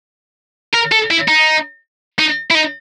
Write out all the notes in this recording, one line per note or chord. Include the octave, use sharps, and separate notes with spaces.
A#4
A4
E4
D#4
D#4
E4
D#4